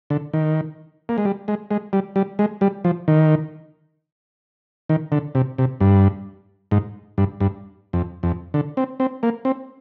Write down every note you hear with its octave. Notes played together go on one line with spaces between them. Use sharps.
D3
D#3
A#3
G#3
G3
G#3
G#3
G3
G3
G#3
G3
F3
D#3
D#3
D3
C3
C3
G2
G#2
G2
G2
F2
F2
D3
C4
C4
A#3
C4